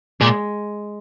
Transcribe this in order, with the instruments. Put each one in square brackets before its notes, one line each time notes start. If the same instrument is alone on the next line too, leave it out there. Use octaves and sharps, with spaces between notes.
[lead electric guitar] A#2 [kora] G#3